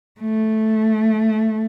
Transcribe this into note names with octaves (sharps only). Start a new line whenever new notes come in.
A3